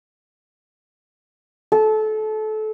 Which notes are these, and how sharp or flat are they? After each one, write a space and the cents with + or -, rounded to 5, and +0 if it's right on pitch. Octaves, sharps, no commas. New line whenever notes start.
A4 -25